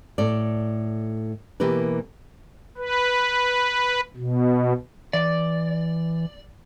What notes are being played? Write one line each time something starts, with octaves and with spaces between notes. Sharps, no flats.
A2 A4 D5
B2 E3 A#3 G4 A#4 B4
B4
B2
E3 D5